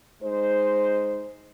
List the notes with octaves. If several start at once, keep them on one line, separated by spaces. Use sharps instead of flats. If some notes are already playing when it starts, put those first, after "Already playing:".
G#3 D#4 C5